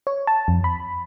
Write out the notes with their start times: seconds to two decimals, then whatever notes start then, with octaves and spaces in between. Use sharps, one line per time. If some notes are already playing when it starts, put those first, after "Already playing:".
0.07 C#5
0.27 A5
0.48 F2
0.64 B5